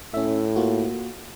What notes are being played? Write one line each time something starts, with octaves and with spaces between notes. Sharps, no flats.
A2 C#4 E5
A#3 F4 F#4